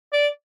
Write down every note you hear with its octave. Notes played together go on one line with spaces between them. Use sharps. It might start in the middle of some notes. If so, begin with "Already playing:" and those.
D5